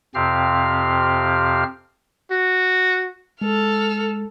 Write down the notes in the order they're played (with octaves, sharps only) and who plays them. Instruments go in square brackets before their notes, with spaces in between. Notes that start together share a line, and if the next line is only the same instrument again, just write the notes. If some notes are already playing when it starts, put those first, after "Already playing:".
[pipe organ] F2 C3 C4 G4 F5 F6
[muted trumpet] F#4
[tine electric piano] G#3 [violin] A4 F6